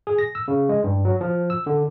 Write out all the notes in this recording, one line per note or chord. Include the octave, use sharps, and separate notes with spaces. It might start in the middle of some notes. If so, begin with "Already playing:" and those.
G#4
A#6
E6
C#3
G#3
G2
F#3
F3
E6
D3